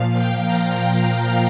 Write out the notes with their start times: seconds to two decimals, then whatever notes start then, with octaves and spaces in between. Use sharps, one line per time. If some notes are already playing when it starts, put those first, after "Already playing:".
Already playing: A#2 F3 F5
0.14 G5
0.43 A#5
0.72 G5
1.00 A#5